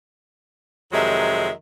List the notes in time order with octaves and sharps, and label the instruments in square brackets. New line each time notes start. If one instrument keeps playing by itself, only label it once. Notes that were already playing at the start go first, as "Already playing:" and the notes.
[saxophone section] F2 C3 D#3 F#3 G#3 E5